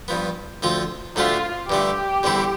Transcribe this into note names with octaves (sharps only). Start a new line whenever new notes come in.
G2 F3 B3
D2 D3 F3 C4 F4
D2 D3 A3 D4 F4 G4
G2 D3 A3 G4
E2 D3 G3 C4 E4